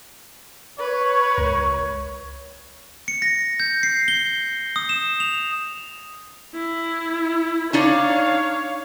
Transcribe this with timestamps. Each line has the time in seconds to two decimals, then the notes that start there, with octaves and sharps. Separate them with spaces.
0.79 B4 C#5
1.38 C#2
3.08 C#7
3.22 A#6
3.60 G6
3.83 C7
4.08 G7
4.76 D#6
4.89 E7
5.20 F7
6.55 E4
7.73 D4 D#4 C#5 D5 F5